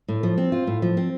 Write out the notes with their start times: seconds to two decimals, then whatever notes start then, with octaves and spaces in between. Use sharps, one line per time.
0.08 A2
0.23 F3
0.38 C4
0.52 F4
0.67 A2
0.82 F3
0.97 C4